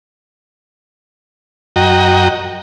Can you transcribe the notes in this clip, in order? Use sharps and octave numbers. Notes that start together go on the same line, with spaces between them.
F#2 F#4 D#5 G5 A#5